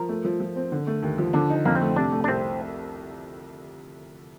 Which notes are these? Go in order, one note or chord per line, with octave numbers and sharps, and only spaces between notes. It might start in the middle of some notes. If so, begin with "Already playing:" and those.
Already playing: F3 A#4
A3
F3
F3
C4
D3
A3
D#2
F3
D3 D4
D#4
F2 A#3
C4
A3
C3 D4
A3
D4
C2 C4